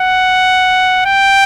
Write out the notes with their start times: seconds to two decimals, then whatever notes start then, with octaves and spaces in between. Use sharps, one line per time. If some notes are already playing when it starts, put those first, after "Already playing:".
Already playing: F#5
1.06 G5